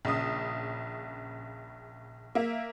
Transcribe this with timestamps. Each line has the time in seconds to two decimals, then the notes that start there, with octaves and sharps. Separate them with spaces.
0.05 A#1 C#3 D#6
2.35 A#3 E5